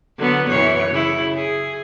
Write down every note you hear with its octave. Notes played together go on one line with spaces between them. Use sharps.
D3 F#3 B3
F#2 E3 C#5
C#3 E4
G#4